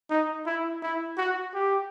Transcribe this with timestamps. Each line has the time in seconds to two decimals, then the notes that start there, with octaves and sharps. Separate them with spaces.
0.10 D#4
0.46 E4
0.82 E4
1.17 F#4
1.54 G4